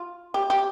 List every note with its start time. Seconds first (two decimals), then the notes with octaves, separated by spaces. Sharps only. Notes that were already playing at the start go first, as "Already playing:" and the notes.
Already playing: F4
0.34 G4
0.50 G4